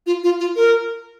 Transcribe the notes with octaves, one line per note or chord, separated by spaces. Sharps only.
F4
F4
F4
A#4